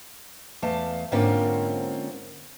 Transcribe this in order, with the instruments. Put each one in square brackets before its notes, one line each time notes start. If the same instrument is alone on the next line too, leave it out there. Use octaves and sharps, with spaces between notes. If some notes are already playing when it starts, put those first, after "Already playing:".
[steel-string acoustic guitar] E2 A3 F5 A5
G#2 D3 A#3 C4 C#4 F4